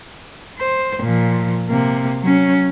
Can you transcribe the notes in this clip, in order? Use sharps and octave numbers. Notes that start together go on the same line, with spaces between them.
C5
A#2 F3
C3 A#3
F#3 C#4